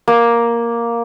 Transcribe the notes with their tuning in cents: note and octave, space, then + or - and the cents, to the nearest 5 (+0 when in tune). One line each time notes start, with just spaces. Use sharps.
A#3 +5